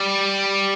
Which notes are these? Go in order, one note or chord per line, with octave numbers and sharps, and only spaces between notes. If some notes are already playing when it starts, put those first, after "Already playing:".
Already playing: G3